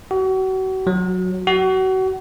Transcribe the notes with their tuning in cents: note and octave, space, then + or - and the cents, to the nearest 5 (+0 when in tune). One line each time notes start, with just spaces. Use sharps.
F#4 +35
F#3 -10
F#4 +30